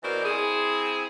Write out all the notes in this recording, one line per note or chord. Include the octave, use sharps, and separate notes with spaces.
B2 E3 A#4 C5 D5
C4 E4 G#4